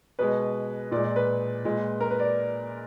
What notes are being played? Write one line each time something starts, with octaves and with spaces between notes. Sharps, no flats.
B2 G#3 B4
A#2 G#3 D5
D5
B4
A#2 G#3
A#4
B4
D5